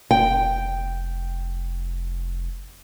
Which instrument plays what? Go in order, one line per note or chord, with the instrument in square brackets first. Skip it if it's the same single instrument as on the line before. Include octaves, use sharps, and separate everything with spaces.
[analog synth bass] F1 [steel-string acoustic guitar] G5